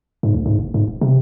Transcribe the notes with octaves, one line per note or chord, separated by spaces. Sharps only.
G#2
D2
G#2
F#1
G#2
D#1
C3